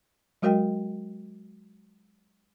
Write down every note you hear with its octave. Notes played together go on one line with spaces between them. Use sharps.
F#3 G#3 F#4 A#4 D#5 G5